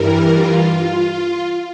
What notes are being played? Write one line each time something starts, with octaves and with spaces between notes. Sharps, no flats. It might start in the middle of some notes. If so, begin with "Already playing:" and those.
Already playing: G2 E3 G3 A#4
F4